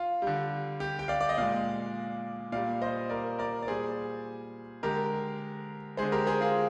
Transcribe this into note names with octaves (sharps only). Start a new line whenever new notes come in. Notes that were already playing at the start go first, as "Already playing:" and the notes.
Already playing: F4
D3 G3
G4
G5
D5 F5
D5
D#5
A#2 G#3 D5 F5
A#2 G3 D5 F5
C5 D#5
A#4 D5
A#4 D5
D5
A#2 G3 G#4 C5
D3 G#3 G4 A#4
D3 G#3 G#4 C5
G4 A#4
G#4 C5
F4 G#4